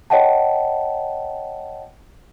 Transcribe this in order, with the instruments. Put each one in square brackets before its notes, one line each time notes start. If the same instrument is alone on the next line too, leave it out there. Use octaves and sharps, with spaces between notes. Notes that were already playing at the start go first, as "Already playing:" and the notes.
[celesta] C#5 D#5 F#5 G5 A5